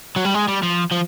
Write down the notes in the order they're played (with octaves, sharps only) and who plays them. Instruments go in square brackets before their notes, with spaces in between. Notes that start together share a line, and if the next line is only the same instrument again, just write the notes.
[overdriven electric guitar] F#3
G3
G#3
G3
F3
F3